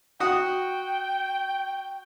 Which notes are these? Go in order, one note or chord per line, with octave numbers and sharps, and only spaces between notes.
F#4 F#5 G5 D#6